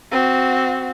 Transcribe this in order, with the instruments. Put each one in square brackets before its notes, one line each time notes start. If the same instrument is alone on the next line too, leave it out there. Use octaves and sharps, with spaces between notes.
[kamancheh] C4 F#4